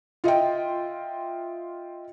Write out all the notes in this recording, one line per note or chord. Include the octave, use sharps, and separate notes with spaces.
F4 D#5 E5 G5